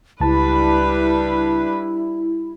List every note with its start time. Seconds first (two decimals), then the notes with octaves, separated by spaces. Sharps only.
0.20 C#2 G3 D4 E4 B4 A5